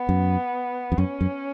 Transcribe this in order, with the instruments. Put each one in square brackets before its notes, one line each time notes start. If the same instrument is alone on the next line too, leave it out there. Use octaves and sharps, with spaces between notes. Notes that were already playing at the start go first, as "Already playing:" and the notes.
Already playing: [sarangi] B3
[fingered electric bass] F#2
F2
[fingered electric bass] F#2 [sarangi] C#4
[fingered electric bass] F#2